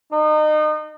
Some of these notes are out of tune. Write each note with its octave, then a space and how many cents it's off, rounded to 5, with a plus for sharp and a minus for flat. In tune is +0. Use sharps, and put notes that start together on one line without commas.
D#4 -30